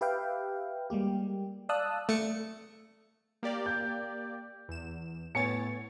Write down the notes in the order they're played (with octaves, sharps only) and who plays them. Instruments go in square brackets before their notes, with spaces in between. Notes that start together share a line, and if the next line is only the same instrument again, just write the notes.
[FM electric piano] G4 B4 E5 F5 G5
G3 G#3 A#3 G4
D5 F5 A5 D#6 E6 F#6
[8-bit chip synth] A3 C#7
[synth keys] A#3 G4 D5
[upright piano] G6
[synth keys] E2 E7
[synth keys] A2 C#5 A6 [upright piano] B3 G#5 C#7